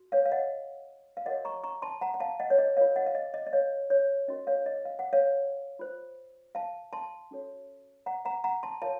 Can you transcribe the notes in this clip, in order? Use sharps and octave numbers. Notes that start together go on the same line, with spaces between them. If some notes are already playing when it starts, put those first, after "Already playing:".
Already playing: F#4
C#5 F5
F5
D#5 F#5
F5
F#4 A#4 C#5 D#5 F#5
A#5 C#6
A#5 C#6
A5 C6
F#5 A#5
F#5
F5 A5
D#5 F#5
C#5
D#5
F4 A#4 C#5 F5
D#5 F#5
F5
D#5
D#5
D#5
C#5 F5
C#5
C#4 F#4 A#4 D#5
C#5 F5
D#5
F5
F#5
C#5 F5
F4 C5
F5 A5
A5 C6
C#4 F#4 A4 C#5
F#5 A#5
F#5 A#5
F#5 A#5
A5 C6
F4 A#4 C#5 F5 A5